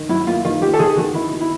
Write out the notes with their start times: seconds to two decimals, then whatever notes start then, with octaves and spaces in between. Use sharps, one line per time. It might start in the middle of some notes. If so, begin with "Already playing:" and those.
Already playing: D#3
0.09 F#3 E4
0.27 A#3 F4
0.45 D#3 F4
0.61 D#3 G4
0.74 A4
0.79 D#3 G#4
0.97 D#3 F#4
1.14 D#3 E4
1.32 D#3
1.41 E4